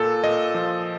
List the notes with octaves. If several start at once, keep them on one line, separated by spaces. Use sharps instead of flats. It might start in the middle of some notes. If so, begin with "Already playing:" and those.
Already playing: A#2 A4
A#2 D#5
F3